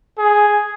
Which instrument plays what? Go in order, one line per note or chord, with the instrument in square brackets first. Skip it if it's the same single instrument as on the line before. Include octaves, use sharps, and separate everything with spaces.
[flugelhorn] G#4